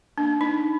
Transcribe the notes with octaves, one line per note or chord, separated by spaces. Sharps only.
A#3 D4
D#4